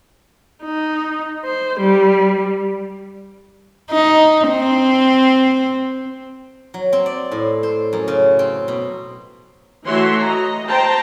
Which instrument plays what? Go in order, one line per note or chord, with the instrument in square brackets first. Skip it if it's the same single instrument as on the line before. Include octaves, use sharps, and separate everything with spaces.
[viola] D#4
C5
G3
[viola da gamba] D#4
C4
[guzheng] F#3
C4
D5
A2
C5
F#2
C#3
C4
B2
[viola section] E3 A3 F#4 C#5 E5 C6
D#5 A#5
C5 G5 A5 A#5